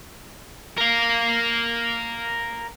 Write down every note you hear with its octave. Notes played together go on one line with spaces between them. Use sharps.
A#4 F5